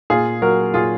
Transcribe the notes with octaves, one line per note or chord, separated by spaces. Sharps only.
A#2 F4 G#4
F#3 F#4 A#4
A#2 F4 G#4